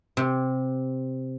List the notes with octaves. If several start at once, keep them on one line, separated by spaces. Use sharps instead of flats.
C3